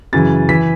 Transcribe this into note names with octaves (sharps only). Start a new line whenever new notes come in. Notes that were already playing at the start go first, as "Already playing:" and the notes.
F#2 C#3 E3 A6
E3 B6